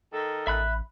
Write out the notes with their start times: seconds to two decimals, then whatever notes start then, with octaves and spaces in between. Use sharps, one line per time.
0.14 D#3 A4
0.47 A1 E5 B5 F#6